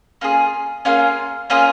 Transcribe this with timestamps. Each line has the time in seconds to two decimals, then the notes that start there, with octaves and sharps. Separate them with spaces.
0.21 A#3 C#4 F4 G#4
0.85 A#3 C#4 F4 G#4
1.50 A#3 C#4 F4 G#4